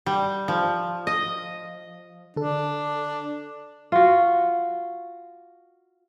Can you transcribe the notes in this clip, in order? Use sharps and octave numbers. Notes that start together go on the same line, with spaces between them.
G3
F3
D#5
D3 D4 A4
F4 F#4